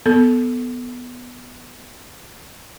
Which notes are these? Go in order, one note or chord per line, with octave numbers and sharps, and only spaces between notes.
B3 A4